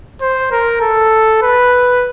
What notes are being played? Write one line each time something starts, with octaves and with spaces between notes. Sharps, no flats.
C5
A#4
A4
B4